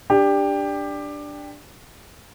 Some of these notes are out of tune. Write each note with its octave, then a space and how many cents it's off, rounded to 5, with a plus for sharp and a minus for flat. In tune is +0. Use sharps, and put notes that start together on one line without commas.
D4 +0 G4 +15